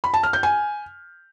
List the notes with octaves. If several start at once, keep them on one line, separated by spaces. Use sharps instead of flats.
B5
A5
F6
G6
G#5